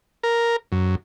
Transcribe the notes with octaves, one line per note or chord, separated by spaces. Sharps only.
A#4
F#2